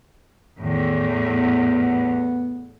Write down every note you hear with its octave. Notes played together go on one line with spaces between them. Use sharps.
E2 A2 D#3
B3